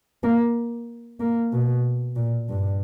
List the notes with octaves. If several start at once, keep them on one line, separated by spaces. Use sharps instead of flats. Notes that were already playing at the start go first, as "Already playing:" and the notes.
A#3
A#3
B2
A#2
G2